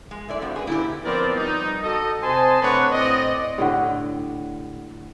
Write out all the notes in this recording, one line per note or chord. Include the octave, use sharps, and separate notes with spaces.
G#3
A3 E4 D5
G2 C4 F#4
G#4 B4
A#2 D3 E4 G4
F3 B3 C4 A#4 D5
G3 D#4
F#4 A4 D#5
C3 C5 D#5 G#5 A5 C6
A3 C4 D4 B4 C#5 F#5
A2 C4 D5 D#5
A2 D3 G4 F#5